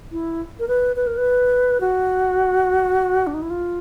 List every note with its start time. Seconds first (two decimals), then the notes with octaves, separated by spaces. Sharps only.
0.12 E4
0.59 A#4
0.68 B4
0.96 B4
1.07 A#4
1.18 B4
1.81 F#4
3.27 D4
3.34 D#4
3.42 E4
3.50 F4